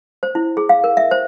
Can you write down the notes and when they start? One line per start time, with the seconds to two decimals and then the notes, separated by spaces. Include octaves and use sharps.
0.23 C5
0.35 E4
0.57 G#4
0.69 F5
0.84 A#4
0.97 E5
1.11 C5